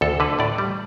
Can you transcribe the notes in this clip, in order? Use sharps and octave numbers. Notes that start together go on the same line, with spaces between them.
D2 A4
D3 B4
A2 D5
G3